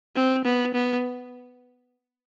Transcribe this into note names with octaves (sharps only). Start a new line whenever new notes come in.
C4
B3
B3